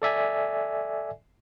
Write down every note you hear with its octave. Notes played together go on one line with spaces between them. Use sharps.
A4 D5 E5 G#5